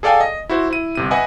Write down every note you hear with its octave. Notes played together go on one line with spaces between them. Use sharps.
G#4 A4 D5 F5 G5 G#5
D#5
E4 F#4 C5
E4 D#7
G1 C3 D#7
B4 D#5 E5 F#5 G#5